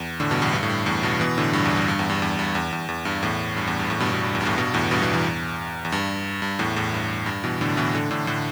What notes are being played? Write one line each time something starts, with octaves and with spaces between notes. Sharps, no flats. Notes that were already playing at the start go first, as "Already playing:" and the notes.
Already playing: E2
A2 D3
G2 B2
E2 A2
G2
A2
G2
E2 A2
G2 B2
B2 E3
A2 D3
G2
E2
G2
G2
E2
G2
E2
G2
E2
E2
E2
G2
E2 A2
G2
E2
G2
E2 A2
G2 B2
G2 B2
G2
E2
G2
E2 A2
G2 B2
E2 A2
G2 B2
B2 E3
E2
E2
G2
G2
E2 A2
E2 A2
G2
G2
B2 E3
A2 D3
B2 E3
A2 D3
A2 D3
A2 D3